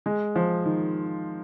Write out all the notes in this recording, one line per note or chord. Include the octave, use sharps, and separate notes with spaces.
G#3
F3
D#3